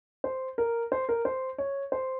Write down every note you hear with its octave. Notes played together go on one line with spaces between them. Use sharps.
C5
A#4
C5
A#4
C5
C#5
C5